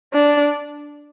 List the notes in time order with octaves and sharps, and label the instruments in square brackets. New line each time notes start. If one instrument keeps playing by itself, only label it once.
[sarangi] D4